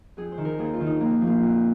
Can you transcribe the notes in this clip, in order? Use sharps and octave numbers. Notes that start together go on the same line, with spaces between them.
F2 G#4
C5
D#3
A#4
D#2 G#4
F4
D#3
D#4
F2 A#3
F3
A#3
F2